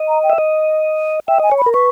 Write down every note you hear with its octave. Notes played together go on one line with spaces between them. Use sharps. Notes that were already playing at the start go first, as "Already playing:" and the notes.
Already playing: D#5
A#5
G5
E5
D#5
E5 G5
D#5 G#5
C#5
B5
A#4
B4 C#6